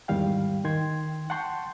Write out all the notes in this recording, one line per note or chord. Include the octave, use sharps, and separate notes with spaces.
E2 G#2 D#3 G3 F5 G5
D#3 G5 C6 G#6
F#5 G5 A5 C6 C#6 G6